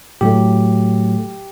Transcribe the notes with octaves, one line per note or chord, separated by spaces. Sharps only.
A2 F#3 A3 G4